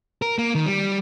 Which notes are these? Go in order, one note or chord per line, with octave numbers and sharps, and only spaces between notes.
A#4
A#3
D#3
G3